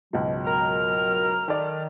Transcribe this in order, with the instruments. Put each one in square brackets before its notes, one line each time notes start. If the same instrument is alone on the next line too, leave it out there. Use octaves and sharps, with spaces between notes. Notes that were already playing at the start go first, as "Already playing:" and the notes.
[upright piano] C#2 G#2 B2 [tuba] F#3
[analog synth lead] A#4 [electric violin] F6
[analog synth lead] D#3 [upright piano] A4 D5